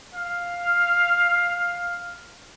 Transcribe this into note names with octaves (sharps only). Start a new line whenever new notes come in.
F5